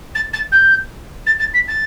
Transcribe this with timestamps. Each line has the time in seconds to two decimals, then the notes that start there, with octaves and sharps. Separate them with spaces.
0.14 A6
0.33 A6
0.51 G6
1.26 A6
1.39 A6
1.53 B6
1.67 A6